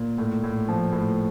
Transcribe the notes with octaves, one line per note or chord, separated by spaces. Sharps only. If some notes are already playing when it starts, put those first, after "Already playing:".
Already playing: A#2
A2
A2
F3
A2